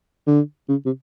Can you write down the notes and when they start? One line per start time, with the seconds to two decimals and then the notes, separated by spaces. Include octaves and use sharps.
0.27 D3
0.69 C#3
0.86 C3